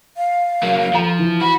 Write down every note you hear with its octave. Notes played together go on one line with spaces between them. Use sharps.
F5
F#3 A#3
F3 A4 A#5
E3
F#4 B5